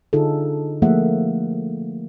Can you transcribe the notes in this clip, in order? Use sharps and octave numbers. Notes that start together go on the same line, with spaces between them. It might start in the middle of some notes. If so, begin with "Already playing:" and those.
D3 D#4 F4 G#4 A4
F3 A3 A#3 G#4 E5 F#5